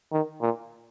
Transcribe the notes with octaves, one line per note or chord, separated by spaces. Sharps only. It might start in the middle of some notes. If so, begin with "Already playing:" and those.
D#3
A#2